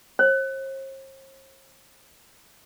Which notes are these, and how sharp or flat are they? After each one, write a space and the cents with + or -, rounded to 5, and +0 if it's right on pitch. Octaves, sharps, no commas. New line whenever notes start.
C5 +45